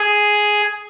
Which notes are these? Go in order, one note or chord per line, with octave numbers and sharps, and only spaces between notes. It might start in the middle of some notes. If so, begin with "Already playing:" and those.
Already playing: G#4